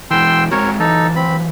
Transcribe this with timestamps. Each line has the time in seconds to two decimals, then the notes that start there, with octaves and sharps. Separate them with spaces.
0.11 E3 G#3 G5 C6 E6
0.51 G#3 C4 F#4 A#4 C#5
0.79 E3 F#3 D#4 A4
1.16 C4 B5